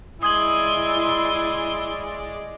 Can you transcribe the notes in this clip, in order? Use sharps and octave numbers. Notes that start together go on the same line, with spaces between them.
G#3 E4 D5 G#5 C6 D#6 G#6 F#7